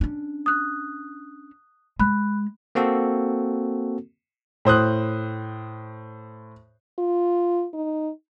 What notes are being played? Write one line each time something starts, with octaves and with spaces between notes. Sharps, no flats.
C#4 D4
D#6 F#6
G#3 B5 F#6
A#3 C4 F#4 A4
A2 C5 D#6 F#6
F4
D#4